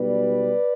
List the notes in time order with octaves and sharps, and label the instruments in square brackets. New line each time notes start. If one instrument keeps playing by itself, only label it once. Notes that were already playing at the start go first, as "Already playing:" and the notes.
Already playing: [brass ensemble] B1 B2 G3 B4 D5